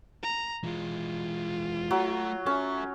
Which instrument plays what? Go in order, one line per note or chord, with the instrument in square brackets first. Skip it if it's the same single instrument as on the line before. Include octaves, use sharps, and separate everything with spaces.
[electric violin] A#5
[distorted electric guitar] E3 G#3 [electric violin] F4
[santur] F#3 [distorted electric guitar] A3
[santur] C#4 [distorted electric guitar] A4 E5